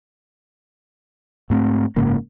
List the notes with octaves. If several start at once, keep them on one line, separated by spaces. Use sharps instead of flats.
G#2 A3 C4
F#1 G#2 C#3 A#3